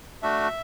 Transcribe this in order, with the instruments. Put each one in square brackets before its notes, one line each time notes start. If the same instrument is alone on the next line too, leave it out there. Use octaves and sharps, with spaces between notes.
[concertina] A3 D4 F#4 E5